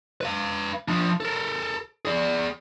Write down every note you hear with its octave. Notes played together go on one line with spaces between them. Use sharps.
B4 F5
F3 D4
A4 A#4
G#4 D5